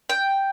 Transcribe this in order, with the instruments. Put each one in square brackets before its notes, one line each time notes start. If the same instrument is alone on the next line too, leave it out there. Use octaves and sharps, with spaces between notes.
[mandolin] G5